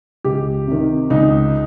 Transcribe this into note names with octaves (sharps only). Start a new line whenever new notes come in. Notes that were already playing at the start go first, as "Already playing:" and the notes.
C#2 G4
C3 D#3
C#2 D#4